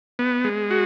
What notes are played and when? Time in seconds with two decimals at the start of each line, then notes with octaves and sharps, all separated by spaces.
0.19 B3
0.44 G#3
0.71 F#4